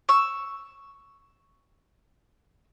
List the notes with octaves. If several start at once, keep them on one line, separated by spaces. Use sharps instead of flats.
C#6 E6